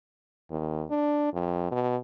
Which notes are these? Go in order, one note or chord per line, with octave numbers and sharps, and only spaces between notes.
D#2
D4
F2
B2